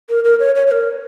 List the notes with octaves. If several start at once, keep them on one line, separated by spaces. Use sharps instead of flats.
A#4
A#4
C#5
C#5
C#5
A#4